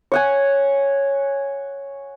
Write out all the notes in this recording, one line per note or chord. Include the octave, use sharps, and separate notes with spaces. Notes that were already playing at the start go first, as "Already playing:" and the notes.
C#5 F#5 G#5